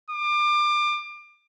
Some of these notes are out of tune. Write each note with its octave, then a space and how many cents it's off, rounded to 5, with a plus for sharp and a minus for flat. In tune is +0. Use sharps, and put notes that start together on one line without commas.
D6 +30